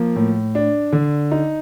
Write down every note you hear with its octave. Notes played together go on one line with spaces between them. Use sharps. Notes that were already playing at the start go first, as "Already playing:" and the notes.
Already playing: F3 A#3
A2
D4
D3
D#4